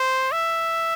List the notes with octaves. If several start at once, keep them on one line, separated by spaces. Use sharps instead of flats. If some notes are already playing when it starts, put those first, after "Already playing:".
Already playing: C5
E5